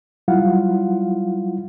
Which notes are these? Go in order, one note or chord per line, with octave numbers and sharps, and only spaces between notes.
F#3 G3 E4 F4 F5 F#5